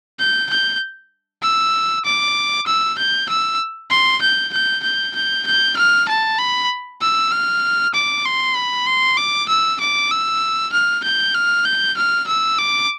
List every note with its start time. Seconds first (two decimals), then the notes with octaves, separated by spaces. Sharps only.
0.19 G6
0.50 G6
1.43 E6
2.05 D6
2.67 E6
2.99 G6
3.29 E6
3.91 C6
4.22 G6
4.53 G6
4.84 G6
5.16 G6
5.47 G6
5.77 F6
6.09 A5
6.39 B5
7.01 E6
7.32 F6
7.94 D6
8.26 C6
8.56 B5
8.87 C6
9.17 D6
9.49 E6
9.81 D6
10.12 E6
10.72 F6
11.04 G6
11.35 F6
11.65 G6
11.97 F6
12.28 E6
12.59 D6